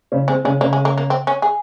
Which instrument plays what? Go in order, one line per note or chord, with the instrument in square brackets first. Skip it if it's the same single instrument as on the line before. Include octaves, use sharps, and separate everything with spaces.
[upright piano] C#3 C#4
[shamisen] G#3 [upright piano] C4
[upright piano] C#3 C#4 [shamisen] G#3
[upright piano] C#3 C#4 [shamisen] A#3
[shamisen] G#3
A#3
A#3
C4
C#4
G#4